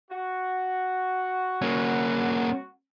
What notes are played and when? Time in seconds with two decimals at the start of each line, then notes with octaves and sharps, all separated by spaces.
0.11 F#4
1.62 A#3 C#4